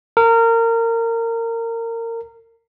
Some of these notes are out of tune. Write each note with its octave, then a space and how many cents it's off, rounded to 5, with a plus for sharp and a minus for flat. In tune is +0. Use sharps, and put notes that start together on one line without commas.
A#4 -25